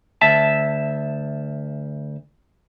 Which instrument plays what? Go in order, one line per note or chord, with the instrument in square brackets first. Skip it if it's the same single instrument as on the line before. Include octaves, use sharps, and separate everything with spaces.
[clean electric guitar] D2 E5 A5